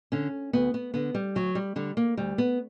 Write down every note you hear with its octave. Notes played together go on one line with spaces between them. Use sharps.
D3 C#4
D2 B3
B3
D3 B3
G3
D2 F#3
G3
D3 G3
A#3
D2 G3
B3